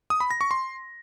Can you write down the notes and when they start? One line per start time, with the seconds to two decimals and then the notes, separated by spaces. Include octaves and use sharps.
0.10 D#6
0.20 B5
0.31 A#6
0.41 C#6
0.51 C6